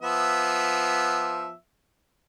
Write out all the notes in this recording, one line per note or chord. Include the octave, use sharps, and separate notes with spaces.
F3 B3 E5